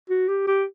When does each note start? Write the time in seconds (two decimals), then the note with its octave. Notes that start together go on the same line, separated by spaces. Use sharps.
0.10 F#4
0.29 G4
0.47 G4